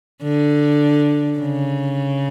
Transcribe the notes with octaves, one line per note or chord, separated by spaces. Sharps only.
D3
C#3